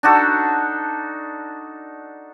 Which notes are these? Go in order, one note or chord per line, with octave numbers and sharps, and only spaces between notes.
D4 D#4 F#4 A4